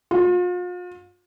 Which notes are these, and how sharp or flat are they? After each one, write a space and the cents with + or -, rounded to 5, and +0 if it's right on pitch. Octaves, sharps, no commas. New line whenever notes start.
F4 +40